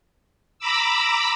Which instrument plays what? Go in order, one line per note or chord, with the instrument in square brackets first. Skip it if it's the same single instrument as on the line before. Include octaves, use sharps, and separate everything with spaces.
[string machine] A#5 B5 D6 E6